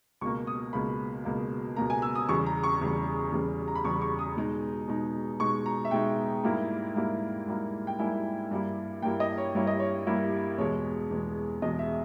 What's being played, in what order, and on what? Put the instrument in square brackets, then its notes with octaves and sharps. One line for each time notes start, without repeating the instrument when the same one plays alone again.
[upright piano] C#2 B2 A#3 C#6
D#6
C#2 B2 A#3 B5
C#2 B2 A#3
C#2 B2 A#3 A#5
G#5
E6
D#6
E2 C#3 G3 C#6
A#5
C#6
E2 C#3 G3
E2 C#3 G3
A#5
B5
E2 C#3 G3 C#6
C#6
D#6
B2 G#3 D#4
B2 G#3 D#4
B2 G#3 D#4 C#6
A#5
E5
B2 G#3 D#4 G5
G#2 G3 A#3 E4
G#2 G3 A#3 E4
G#2 G3 A#3 E4
G5
G#2 G3 A#3 E4 G#5
G2 G3 A#3 E4
G2 G3 A#3 E4 G5
D#5
C#5
G2 G3 A#3 E4 C#5
D#5
C#5
G2 G3 A#3 E4
E2 B2 G#3 C#5
E2 B2 G#3
E2 B2 G#3 D#5
E5